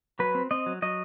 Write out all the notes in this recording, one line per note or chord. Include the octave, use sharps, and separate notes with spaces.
F#3 B4
C4
C4 D#5
F#3
F#3 D#5